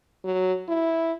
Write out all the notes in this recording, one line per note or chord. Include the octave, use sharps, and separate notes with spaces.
F#3
E4